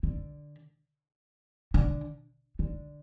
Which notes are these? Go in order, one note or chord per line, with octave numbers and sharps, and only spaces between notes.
D3
D3
D3